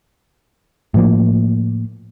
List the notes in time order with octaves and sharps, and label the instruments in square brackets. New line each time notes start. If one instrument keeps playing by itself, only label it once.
[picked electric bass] A2 F3 A#3